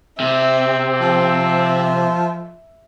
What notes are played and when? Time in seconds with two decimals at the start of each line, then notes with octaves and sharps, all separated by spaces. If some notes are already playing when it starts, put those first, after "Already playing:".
0.20 C3 C4 E5
1.00 F3 E5